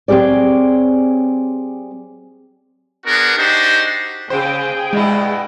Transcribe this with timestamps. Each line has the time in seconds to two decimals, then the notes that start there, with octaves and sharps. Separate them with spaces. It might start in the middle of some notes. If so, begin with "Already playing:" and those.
0.08 F#3 C4 G4 G#4 D5
3.07 B3 D4 F#4 G#4 A#4
3.38 D4 D#4 F#4 G4 C5
4.30 C#3 G#4 C5 G5
4.93 G2 B2 G#3 E4